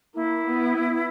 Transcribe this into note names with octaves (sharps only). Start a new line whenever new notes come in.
A#3 E4
B3